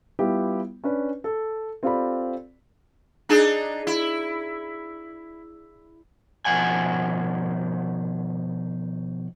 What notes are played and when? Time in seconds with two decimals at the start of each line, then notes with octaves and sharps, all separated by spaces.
0.19 G3 B3 E4 F4 G4
0.84 C#4 D4 B4
1.24 A4
1.83 C4 F4 G4 A4 D5 B5
3.29 D4 D#4 G#4
3.87 E4
6.45 B2 D#3 F3 F#5 G#5